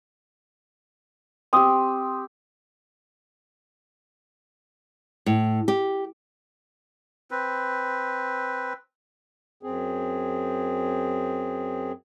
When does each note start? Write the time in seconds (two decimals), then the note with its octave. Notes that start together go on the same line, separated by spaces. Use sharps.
1.53 C4 G4 D#6
5.26 A2
5.68 G4
7.31 C4 B4
9.63 F#2 C4 G#4